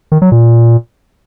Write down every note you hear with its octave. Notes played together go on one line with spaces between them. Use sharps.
D#3
F#3
A#2